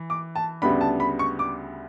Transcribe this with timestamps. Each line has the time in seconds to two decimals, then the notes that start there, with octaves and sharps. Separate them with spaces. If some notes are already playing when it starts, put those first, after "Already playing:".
Already playing: E3
0.10 D6
0.35 A5
0.62 D2 C#3 G3 B3 D4 B5
0.81 A5
1.00 B5
1.19 C#6
1.39 D6